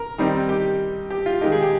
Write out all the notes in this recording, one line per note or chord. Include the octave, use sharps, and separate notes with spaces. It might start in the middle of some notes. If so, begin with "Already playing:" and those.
Already playing: A#4
D#3 G3 C4 D#4
G4
G4
F4
D#3 G#3 D#4 G4
G#4
G4